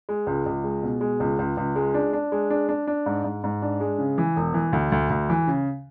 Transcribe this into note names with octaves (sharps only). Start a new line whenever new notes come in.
G#3
C#2
C#2
G#3
B2
G#3
C#2
C#2
C#2
G#3
D4
D4
G#3
D4
D4
D4
G#2
G#2
G#2
D4
G#3
C#3
E3
E1
E3
D2
D2
D2
E3
C#3